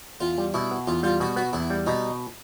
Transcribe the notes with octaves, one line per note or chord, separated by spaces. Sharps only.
E2 F4
G3
B2 E4
B3
E2 F4
G3 F4
B2 F#4
B3 F#4
E2 E4
G3
B2 D#4